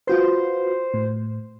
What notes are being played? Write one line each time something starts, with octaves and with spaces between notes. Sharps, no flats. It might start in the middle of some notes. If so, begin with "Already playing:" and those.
F4 F#4 B4 C5
A2